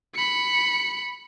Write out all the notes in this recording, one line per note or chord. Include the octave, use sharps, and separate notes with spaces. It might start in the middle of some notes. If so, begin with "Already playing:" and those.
B5 C#7